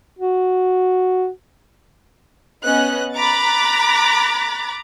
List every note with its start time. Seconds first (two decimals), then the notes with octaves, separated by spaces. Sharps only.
0.19 F#4
2.64 B3 C#4 D#5 F#6
3.16 A#5 B5 D6 F#6 A6